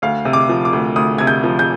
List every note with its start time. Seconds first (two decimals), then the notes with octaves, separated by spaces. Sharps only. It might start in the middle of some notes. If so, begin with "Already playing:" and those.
0.02 D2 F5
0.25 C3
0.33 D6
0.49 F3
0.65 D6
0.73 D2
0.96 D2 D#6
1.18 C3 G#6
1.27 G6
1.44 F3
1.59 G6